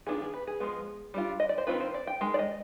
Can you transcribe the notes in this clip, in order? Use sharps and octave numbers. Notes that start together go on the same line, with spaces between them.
D#3 B3 D4 F4 G#4
G#4
B4
G#4
F3 G#3 B3
G3 D4 F4
D#5
D5
C5
D#3 G#3 C4 F4 B4
C5
D5
G5
D#3 G#3
D5
D#5